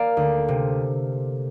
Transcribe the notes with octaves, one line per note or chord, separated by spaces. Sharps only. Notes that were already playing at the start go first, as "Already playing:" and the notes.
Already playing: A#3 D5 F5
D2
C3